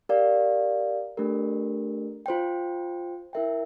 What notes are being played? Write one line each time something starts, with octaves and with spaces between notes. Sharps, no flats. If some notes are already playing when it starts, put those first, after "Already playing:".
G4 A#4 D5 F5
A3 D4 G4 A#4
F4 C5 G5
E4 A#4 E5 G5